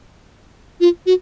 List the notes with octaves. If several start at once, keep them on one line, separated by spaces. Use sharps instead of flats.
F4
F#4